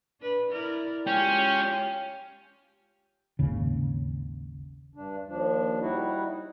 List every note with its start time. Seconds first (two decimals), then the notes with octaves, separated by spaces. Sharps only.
0.21 D4 B4
0.51 E4 A#4 D5
1.07 G#3 C#4 F4 G4 G5
3.39 G#1 D#2 C#3
4.95 G2 D4
5.28 D#2 F3 D4
5.81 G3 D#4 E4 F#4